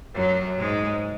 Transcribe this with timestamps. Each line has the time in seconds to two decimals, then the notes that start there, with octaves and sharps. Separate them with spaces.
0.15 F#2 F#3
0.58 G#2 G#3